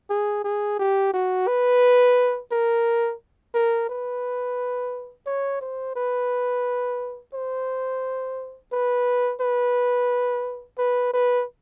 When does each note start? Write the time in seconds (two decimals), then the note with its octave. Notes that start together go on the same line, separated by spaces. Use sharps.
0.10 G#4
0.44 G#4
0.79 G4
1.14 F#4
1.47 B4
2.52 A#4
3.54 A#4
3.89 B4
5.26 C#5
5.61 C5
5.96 B4
7.34 C5
8.72 B4
9.41 B4
10.78 B4
11.13 B4